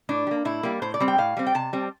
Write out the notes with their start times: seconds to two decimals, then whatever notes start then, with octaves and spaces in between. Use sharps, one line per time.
0.09 A2 D4
0.27 G3
0.31 A#3
0.45 A2 E4
0.63 G3 A#3
0.82 A2 C5
0.94 D5
1.00 G3 C4
1.08 G5
1.18 A2 F5
1.37 G3 C4
1.47 G5
1.55 C3 A5
1.73 G3 C4